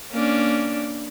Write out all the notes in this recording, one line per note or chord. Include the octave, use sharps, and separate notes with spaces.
A#3 C#4 D4